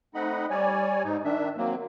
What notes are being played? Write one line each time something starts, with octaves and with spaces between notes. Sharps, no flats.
A3 C4 D#4 D#5 F#5 B5
G3 C#5 D5 G#5
G#2 D#4
D#3 D4 E5
F#3 A#3 C4